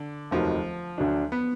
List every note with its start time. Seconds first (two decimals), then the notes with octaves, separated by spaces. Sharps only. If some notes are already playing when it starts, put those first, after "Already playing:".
Already playing: D3
0.31 F1 D#2 D#3 F3 F#3
0.98 D2 D3 F#3 D4
1.32 B3